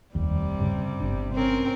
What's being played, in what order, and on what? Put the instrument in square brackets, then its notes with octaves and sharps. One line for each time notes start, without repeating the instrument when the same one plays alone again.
[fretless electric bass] F1 D#2 [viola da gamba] C3 G3
[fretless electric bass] G2 C#3
G1 D4
[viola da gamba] C4 C#4 A#4